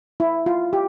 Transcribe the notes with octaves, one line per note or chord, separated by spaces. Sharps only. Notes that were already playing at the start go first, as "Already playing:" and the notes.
E4
F4
G4